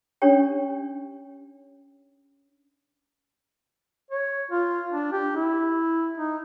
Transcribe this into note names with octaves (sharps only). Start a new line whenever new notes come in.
C#4 D4 G4 C#5 G5
C#5
F4
D4
G4
E4
D#4